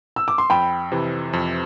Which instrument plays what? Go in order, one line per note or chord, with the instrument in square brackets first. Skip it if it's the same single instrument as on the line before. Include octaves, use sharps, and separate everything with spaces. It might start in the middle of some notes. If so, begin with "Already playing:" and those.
[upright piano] E6
D6
C6
[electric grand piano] F2 [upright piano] G5 B5
[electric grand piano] C3 E3
F2